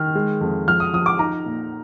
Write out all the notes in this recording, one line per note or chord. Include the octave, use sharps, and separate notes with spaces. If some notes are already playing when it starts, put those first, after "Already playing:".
Already playing: D#3 F6
G#3
F2
F3 F6
D#6
F3 D#6
D6
D#4 A#5
A#2